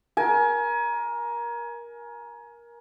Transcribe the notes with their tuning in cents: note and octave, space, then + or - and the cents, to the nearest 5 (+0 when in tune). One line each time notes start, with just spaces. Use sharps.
A#4 +20 G#5 +25